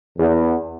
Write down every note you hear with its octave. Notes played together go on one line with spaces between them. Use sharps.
E2